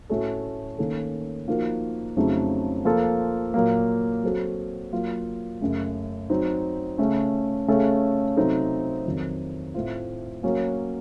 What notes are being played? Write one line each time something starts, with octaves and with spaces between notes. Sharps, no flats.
A2 A3 C#4 F#4 A4
D#3 A#3 C#4 A4
F3 A#3 D#4 F#4 A#4
F2 C#3 F#3 A3 D#4
F3 A#3 F4 A4
A#2 F#3 A#3
F#3 C4 F#4 A4
F#3 A#3 F4
F#2 C#3 A3
F#3 C4 D#4
C#3 A3 C#4
C#3 A3 C#4 A4
C3 F#3 C4 D#4 A4
F2 D#3 F#3
A2 A3 C4 F4
F#3 A#3 C#4